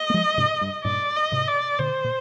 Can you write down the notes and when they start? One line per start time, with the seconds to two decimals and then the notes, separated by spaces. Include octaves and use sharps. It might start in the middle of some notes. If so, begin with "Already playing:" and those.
Already playing: D#5
0.10 A#3
0.14 F3 G#3
0.38 G#2 C3
0.61 G2
0.84 G2 A#2 D5
1.16 D#5
1.32 G#2 C3
1.48 D5
1.79 A#2 D3 C5
2.04 A#2